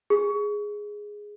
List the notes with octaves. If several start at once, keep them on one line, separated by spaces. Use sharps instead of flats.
G#4